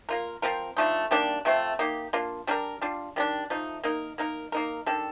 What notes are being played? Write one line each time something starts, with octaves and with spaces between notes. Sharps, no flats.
A#3 F4 A#4
F3 C4 F4 A#4
D3 F3 A3 D#4
D#3 G3 A#3 D4
C3 F3 A3 C4
A#3 D#4 G4
A#3 D4 F4
G3 D4 G4 A#4
G3 D4 F4
D#3 G3 D4
F3 A3 D#4
A#3 D#4 A#4
A#3 D#4 A#4
A#3 D#4 A#4
D#3 G3 D4 A4